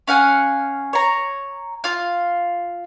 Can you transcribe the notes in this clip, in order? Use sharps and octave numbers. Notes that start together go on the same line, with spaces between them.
C#4 F5 F#5 G#5
C#5 A#5
F4 F5